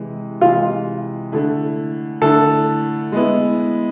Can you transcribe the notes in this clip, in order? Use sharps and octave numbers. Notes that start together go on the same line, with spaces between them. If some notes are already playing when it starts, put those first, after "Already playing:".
Already playing: C3 E3 G#3
C3 E3 G#3 F4
D3 A3 E4
D3 A3 E4 A4
G#3 B3 E4